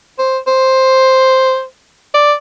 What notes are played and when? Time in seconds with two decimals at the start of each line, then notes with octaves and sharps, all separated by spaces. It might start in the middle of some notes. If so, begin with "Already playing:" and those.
0.19 C5
0.47 C5
2.14 D5